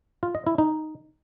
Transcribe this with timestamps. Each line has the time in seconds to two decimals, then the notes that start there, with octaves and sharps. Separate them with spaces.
0.23 F4
0.35 D#5
0.46 E4
0.58 D#4